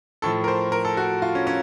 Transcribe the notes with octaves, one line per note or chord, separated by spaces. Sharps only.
A2 F3 A4
A#4
C5
A#4
A4
F#4
F4
C#4
C#4